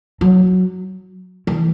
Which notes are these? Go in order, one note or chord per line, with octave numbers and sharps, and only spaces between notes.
F#3
E3